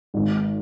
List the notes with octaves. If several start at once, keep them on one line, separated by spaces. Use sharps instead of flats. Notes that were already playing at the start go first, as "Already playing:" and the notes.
G#1